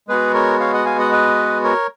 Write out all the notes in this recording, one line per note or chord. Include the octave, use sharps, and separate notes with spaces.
G#3 B3 F#4 G#4 B4
A#4 C#5
C#5 F5
D#5 F#5
F5 G#5
D#5 F#5
B4 D#5
A#4 C#5